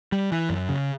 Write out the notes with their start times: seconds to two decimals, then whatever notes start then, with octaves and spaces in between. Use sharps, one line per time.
0.12 G3
0.32 E3
0.50 F#2
0.69 C#3